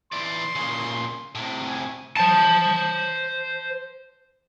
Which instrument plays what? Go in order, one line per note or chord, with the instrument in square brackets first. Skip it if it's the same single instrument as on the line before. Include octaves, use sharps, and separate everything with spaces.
[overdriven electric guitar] E3 D5 [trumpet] C6
[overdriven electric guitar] A#2 C#3
A2 C3
[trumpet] G#5
[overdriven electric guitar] C5 A5